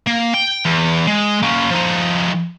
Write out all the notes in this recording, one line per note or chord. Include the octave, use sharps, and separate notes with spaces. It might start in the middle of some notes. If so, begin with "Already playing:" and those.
A#3
G5
E2
G#3
A#3 C#4
F3 D#4